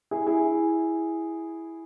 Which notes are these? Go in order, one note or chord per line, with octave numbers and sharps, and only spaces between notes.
E4 G#4
E4 G#4